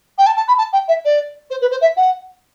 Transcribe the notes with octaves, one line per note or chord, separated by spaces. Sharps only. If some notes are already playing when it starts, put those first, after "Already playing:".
G5
A5
A5
B5
A5
G5
E5
D5
C5
B4
C5
E5
F#5